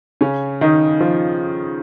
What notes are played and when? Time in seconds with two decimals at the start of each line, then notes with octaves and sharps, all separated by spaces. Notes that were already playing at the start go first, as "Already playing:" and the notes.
0.21 C#3 C#4
0.61 D#3 D#4
1.01 F3 F4